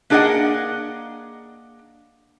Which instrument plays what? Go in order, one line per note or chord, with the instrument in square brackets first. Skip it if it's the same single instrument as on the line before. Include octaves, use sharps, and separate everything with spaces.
[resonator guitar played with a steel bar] A#3 D4 G#4 D5 D#5 F#5